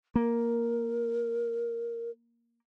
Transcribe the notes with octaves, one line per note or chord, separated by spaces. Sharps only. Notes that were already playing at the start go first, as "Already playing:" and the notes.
A#3 A#4